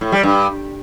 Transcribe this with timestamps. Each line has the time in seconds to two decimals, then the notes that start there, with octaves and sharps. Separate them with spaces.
0.01 A2
0.12 G3
0.23 G2